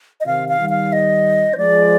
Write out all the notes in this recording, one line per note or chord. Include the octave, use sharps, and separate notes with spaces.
D#5
C3 D#3 F5
F5
D#3 G3
F5
D#5
C5
F3 G#3 D5